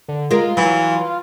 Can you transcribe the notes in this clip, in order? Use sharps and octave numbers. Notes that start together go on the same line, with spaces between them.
D3
G#3 F4 A#4
E3 F#3